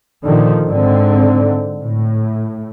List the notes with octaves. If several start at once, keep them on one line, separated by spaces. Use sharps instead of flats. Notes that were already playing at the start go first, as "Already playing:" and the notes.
A#2 D3 D#3 F3
G#2 D3 C4
A2